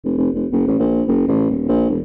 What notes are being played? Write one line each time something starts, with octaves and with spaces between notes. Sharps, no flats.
F1
F1
F1
F#1
A1
A#1
F#1
A1
D#1
A#1
E1